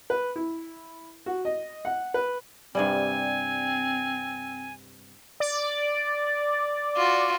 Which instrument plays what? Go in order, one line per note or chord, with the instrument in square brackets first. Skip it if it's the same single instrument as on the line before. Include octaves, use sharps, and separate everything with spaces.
[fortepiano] B4
E4
F#4
D#5
F#5
B4
[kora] G2 C3 G3 [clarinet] C4 [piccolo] G#5
[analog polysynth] D5
[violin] F4 F#4